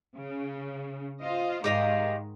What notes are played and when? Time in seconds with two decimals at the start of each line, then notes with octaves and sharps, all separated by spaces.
0.17 C#3
1.22 F4 C5 D#5
1.64 G#2 D#3 G#3 G4 D#5 F5